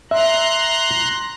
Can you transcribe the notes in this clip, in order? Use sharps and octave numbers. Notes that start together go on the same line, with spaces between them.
E5 A#5 C6 F#6